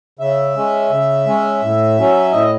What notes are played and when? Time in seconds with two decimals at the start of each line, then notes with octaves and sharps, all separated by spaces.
0.19 C#3 E5
0.56 G#3 C#4
0.90 C#3
1.26 G#3 C#4
1.61 A2
1.97 F#3 C#4
2.32 A2 D#5